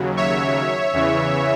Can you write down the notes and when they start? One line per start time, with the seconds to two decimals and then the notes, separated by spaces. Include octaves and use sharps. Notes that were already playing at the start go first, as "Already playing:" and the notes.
Already playing: D#2 C#3 F#3
0.17 C#5 E5
0.93 E2 C#3 E3